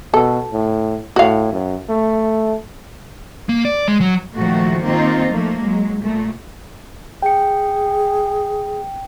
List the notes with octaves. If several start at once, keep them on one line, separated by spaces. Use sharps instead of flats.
B2 A4
A2
A2 F#4 F5
F#2
A3
A#3
D5
G#3
F#3
A#2 D#3 F3 A3 F#4
D#3 A#3 C4 D#4 F4
F3 A3 A#3
F#3 G#3
A#2 A3
G#4 G5 C#7